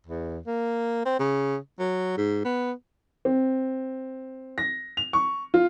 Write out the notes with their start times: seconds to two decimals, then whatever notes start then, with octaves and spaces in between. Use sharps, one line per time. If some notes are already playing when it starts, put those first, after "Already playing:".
0.07 E2
0.47 A#3
1.06 C4
1.19 C#3
1.79 F#3
2.17 G#2
2.44 B3
3.25 C4
4.58 A#6
4.97 F7
5.13 C#6
5.54 F4